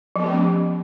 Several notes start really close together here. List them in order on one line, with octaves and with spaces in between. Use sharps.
F3 B3 G4 A3 C#4